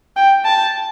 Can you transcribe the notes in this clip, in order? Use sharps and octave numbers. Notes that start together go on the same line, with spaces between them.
G5
A5